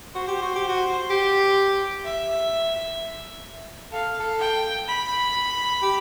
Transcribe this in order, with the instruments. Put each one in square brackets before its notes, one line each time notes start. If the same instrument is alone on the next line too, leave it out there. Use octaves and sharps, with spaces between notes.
[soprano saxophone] F#4 [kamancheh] C5
[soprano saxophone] G4
F#4
G4
F#4
G4
[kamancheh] E5
[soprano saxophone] A4 [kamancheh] F5
[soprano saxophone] A4
[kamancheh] G5
B5
[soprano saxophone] G4